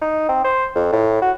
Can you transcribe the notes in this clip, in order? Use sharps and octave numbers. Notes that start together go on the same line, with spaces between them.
D#4
C4
C5
F2
A2
F#4